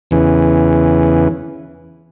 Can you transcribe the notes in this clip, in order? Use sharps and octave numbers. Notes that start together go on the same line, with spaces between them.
E2 C#3 E3